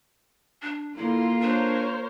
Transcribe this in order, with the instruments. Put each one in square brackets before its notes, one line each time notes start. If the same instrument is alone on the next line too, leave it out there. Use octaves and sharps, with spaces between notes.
[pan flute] D4
[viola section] D3 C6 [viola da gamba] A#3 F4 [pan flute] E4
[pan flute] D4 [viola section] A#4 C5 C#5